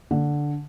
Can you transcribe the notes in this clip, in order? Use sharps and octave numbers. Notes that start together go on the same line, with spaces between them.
D3